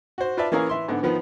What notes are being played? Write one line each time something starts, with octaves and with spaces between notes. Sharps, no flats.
F#4 C5
F4 B4 D5 E5 A5
E3 A#3 C#4 G#4 A#4 F5
E3 E5 C6
G#2 D3 B3
D#3 F3 B3 B4